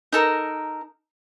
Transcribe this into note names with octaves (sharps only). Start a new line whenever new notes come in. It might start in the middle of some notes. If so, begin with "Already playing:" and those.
D#4 A4 A#4